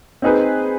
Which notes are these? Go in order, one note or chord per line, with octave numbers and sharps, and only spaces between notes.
C4 D#4 G#4 B4